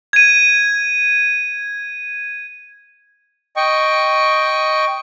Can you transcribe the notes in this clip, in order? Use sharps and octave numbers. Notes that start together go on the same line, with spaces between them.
G#6 D#7
D#5 G5 C#6